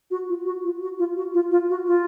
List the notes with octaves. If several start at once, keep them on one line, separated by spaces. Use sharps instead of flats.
F#4
F4
F#4
F4
F#4
F4
F#4
F4
F4
F#4
F4